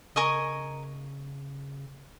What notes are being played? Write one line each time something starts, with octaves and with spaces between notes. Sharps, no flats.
C#3 A#4 D#5 G#5 C#6